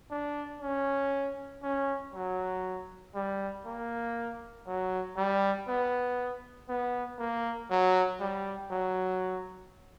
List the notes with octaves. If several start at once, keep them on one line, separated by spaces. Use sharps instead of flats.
D4
C#4
C#4
F#3
G3
A#3
F#3
G3
B3
B3
A#3
F#3
G3
F#3